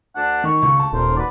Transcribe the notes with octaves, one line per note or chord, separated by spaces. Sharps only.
D2 D4 F#5
D#3 C#6
C#2
A5
D#1 A4 A#4 C5
F#4 B4 D5